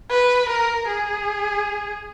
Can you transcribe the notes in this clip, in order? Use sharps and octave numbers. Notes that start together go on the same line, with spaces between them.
B4
A#4
G#4